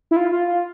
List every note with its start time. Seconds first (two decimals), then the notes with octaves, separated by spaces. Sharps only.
0.11 E4
0.16 F4
0.32 F4
0.48 F4